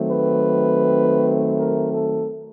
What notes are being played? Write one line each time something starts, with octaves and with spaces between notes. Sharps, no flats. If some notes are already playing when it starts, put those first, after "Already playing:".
Already playing: D#3 F#3 A3 C4
B4
A#4
A4